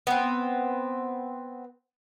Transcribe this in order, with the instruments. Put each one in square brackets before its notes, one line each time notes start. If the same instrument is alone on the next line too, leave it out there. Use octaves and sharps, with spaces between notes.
[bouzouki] B3 C4